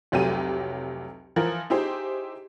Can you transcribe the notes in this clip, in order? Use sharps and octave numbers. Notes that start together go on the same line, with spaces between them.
F1 C2 F#3 A3 G4 D#7
E3 F3 A#4
D#4 E4 G4 G#4 C5